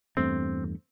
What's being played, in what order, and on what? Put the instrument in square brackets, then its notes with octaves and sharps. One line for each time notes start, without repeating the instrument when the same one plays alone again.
[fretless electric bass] E2 G2 A3 [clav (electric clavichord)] C4